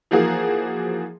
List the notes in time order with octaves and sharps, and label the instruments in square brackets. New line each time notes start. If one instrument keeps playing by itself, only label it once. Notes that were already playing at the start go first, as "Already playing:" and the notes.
[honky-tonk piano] E3 F3 A#3 F#4 G#4